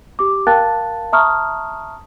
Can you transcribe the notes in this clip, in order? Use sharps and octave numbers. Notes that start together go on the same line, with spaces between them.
G4 D6
A#4 F5 G5 A5 F#6 A6
E5 A5 A#5 C#6 D#6 F6